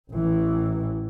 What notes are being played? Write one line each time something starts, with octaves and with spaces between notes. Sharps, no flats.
A1 E3